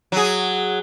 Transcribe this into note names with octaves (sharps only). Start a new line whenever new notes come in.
F#3 G#4